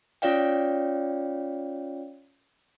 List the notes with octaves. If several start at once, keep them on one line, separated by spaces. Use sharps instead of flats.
C#4 F4 C#5 D5 F5 G5